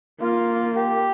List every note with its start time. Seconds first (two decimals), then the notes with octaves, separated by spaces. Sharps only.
0.21 A#3 F4
0.76 G4